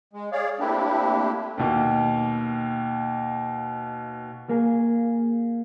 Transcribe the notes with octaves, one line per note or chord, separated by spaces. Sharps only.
G#3
G#4 C#5 D5 F5
A3 A#3 C4 D4 E4 G4
D#2 B2 A#3
A#3 G#4